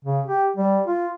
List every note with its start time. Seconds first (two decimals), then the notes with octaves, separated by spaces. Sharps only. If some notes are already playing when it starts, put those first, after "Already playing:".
0.05 C#3
0.26 G4
0.56 G3
0.87 F4